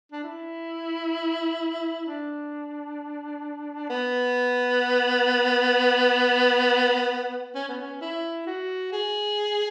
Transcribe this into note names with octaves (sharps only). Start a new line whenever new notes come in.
D4
E4
D4
B3
C#4
B3
C#4
E4
F#4
G#4